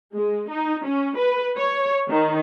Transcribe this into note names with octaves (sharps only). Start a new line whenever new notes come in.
G#3
D#4
C#4
B4
C#5
D#3